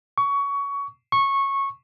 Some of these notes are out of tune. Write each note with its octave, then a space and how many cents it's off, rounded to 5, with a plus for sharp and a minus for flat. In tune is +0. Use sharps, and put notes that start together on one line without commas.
C#6 +20
C#6 -15